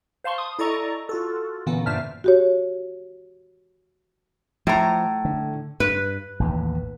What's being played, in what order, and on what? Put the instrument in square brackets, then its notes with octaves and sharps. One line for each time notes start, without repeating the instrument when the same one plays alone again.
[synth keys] C5 F5 A5 C6 C#6
D#6
E4 A4 D5 D#5 A#5 C#6
F4 F#4 A4
A#2 D3 E3 A#3 B3 C#4
G2 C5 D5 E5 A5 F6
[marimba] F#4 G4 C#5
[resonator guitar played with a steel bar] A2 A#5 [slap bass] F3
[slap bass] D3
[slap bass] G2 [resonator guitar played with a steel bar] B4
[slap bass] A1 D#2 A2